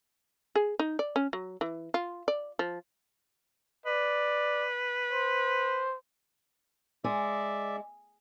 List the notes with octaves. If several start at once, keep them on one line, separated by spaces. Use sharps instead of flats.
G#4
D#4
D5
C#4
F#3
E3
F4
D5
F3
B4 D5
C5
G#3 D5 E5